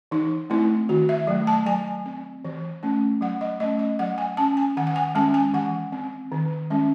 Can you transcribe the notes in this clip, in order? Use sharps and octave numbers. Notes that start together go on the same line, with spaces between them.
E3 D#4
A3 C4 E4
D#3 F#4
E5
F#3 A3
A5
F#3 G#5
C4
E3
A3 C#4
F#3 F#5
D#5
A3 C#4 D#5
D#5
F#3 F#5
G#5
C#4 A5
G#5
D#3 F#5
F#5
G#5
G#3 C#4 A5
G#5
E3 F#5
C4
D#3
G#3 C#4